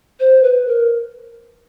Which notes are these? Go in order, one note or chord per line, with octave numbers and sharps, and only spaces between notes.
C5
B4
A#4